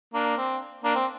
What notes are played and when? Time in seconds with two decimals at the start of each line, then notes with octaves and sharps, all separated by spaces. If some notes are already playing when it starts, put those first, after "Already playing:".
0.14 A#3 D4
0.37 C4
0.84 A#3 D4
0.95 C4